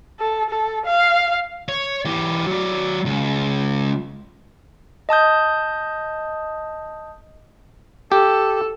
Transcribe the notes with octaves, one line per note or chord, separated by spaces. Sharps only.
A4
A4
F5
C#5
E3 G4
F#3 D5
C#2
D#5 A5 D#6 G6
G4 A4